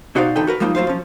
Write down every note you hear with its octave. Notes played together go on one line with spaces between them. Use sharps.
B2 D#4 F#4 C5 D5 F5
E2 D3 D#4 A4 B4 G5
F#4 A#4 B4
F3 G3 G#3 A#3 D#4 F4
F#3 G3 F4 C5 F5
F3 C#4